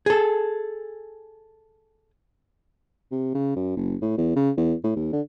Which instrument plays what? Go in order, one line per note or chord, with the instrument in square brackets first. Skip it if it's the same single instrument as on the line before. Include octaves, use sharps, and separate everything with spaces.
[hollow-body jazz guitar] G#4 A4
[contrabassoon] C3
C#3
F#2
F#1
A2
E2
C#3
E2
A2
D#2
D3